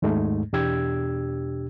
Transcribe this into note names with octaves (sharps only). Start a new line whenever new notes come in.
D#2 G#2 G#3 A3 D#4
E2 B2 D4 G4 E6 G#6